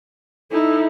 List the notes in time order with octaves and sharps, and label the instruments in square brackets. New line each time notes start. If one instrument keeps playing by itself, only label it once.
[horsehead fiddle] D#4 E4 [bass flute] A4